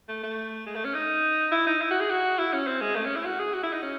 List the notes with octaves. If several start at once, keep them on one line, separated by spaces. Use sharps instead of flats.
A3
A3
G#3
A3
C#4
D#4
E4
D#4
E4
F#4
G#4
F#4
E4
C#4
C4
G#3
A3
C#4
E4
F#4
G#4
F#4
E4
D#4
C#4